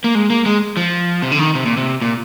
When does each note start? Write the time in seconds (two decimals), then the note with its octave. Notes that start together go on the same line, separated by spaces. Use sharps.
0.04 A#3
0.15 G#3
0.30 A#3
0.46 G#3
0.77 F3
1.22 C3
1.32 D3
1.39 D#3
1.55 C3
1.66 A#2
1.77 C3
2.02 A#2